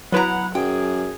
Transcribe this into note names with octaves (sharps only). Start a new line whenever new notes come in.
F#3 B3 E4 B4 F#5 A#5
F#2 G#4 G5